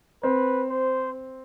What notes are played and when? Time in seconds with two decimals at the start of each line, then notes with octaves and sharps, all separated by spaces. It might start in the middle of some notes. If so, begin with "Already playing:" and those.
0.23 C4 B4
0.70 C5